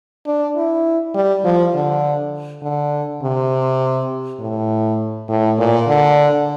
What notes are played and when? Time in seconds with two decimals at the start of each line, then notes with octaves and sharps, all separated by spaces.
0.27 D4
0.56 E4
1.15 G3
1.45 F3
1.75 D3
2.62 D3
3.22 C3
4.40 A2
5.29 A2
5.58 A#2
5.88 D3